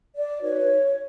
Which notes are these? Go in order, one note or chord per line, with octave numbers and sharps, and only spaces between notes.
D5
D#4 F#4 B4 C#5